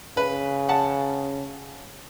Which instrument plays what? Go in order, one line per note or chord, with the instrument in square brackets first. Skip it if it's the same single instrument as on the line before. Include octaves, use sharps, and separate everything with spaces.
[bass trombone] C#3 [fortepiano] B4
[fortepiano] F#5 A5